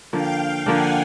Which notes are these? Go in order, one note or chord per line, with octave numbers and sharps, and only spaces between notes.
D3 F3 A#3 F5 G5
D3 F3 A#3 D4 F#5 G#5